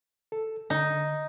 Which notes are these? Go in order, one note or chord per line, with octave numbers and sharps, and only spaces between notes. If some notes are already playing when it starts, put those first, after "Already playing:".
A4
D3 D#4